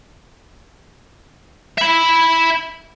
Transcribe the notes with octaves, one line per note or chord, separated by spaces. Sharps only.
E5 B5